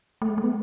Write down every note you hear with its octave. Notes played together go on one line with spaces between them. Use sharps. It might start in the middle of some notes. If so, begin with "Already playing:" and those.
A3
G#3
A3
B3